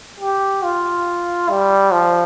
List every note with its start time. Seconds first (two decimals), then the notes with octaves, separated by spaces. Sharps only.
0.20 G4
0.63 F4
1.49 G3
1.91 F3